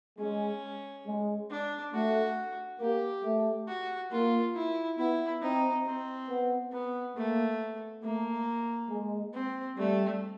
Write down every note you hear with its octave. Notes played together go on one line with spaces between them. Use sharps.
G#3 C#4
G#3
D4
A3 F#4
A#3 G4
A3
F#4
A#3 F4
E4
B3 E4
C4 D#4
C4
B3
B3
A3 A#3
A3 A#3
G#3
C4
G3 A3